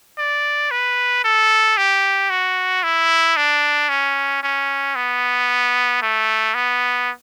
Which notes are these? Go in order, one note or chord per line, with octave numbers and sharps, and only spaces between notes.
D5
B4
A4
G4
F#4
E4
D4
C#4
C#4
B3
A3
B3